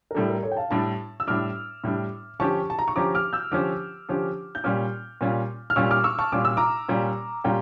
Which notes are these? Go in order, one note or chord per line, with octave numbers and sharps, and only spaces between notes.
A#4
A2 G3 D4 A4
A#4
A4 C#5
G5
F5 A5
A2 G3 D4 A5 C#6
E6
A2 G3 D4 D6 F6
A2 G3 D4
D3 F3 C#4 G4 A5 C#6
A5
A#5
C#6
D3 F3 C#4 G4 A#5 D6
D6 F6
E6 G6
D3 F3 C#4 G4 D6 F6
D3 F3 C#4 G4
G6
A#2 G3 C#4 F4 D6 F6
A#2 G3 C#4 F4
F6
A#2 G3 C#4 F4 C#6 E6
D6 F6
C#6 E6
A5 C#6
A#2 G3 C#4 F4 D6
E6
A#5 D6
A#2 G3 C#4 F4
A#2 G3 C#4 F4 G5 A#5